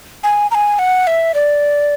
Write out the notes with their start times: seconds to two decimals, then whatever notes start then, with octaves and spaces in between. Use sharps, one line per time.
0.23 G#5
0.51 A#5
0.55 G#5
0.79 F#5
1.07 E5
1.34 D5